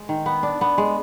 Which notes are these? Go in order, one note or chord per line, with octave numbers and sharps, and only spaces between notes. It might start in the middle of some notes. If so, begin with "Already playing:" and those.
Already playing: G#3
D#3
B3
D4
B3
G#3